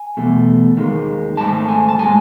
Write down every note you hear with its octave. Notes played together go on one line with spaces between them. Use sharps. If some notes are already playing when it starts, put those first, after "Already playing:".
Already playing: G#5
E2 B2 A3
D#2 D#3 G#3
G#2 D#3 A3 A5
G#5
A5
A2 G#3 G#5